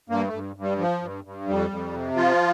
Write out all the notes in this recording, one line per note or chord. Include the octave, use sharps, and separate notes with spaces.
G2 A#3
A3
G2
G2
G3
F3
G2
G2
F2 G3
F2
C3
F3 F4